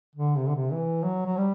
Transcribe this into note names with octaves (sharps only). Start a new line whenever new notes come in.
D3
C3
D3
C3
E3
F#3
F#3
G3